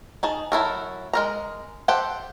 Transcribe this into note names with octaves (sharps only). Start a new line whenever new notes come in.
D#4 G#4 A5
F#3 E4 A4 A#4
G#3 A#4 A#5
G4 A4 C5 F#5 G5